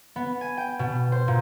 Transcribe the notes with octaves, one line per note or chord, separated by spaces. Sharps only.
B3
G#5
G5
B2
C5
A#2